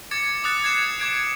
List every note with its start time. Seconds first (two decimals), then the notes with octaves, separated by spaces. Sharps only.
0.11 D6 G#6 A6 C#7
0.44 D6 D#6 F#6 A6 C#7
0.64 G#6 A6 C7 C#7 E7
1.00 D6 G#6 D7